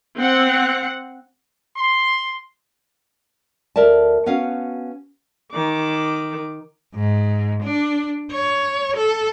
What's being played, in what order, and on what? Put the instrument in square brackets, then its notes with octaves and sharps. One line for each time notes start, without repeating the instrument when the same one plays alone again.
[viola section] C4 F#5
[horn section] C6
[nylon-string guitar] D2 A#4 D5 E5 A5
B3 C#4 F#4 F5 F#5
[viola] D#3 D6
[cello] G#2
D4
C#5
A4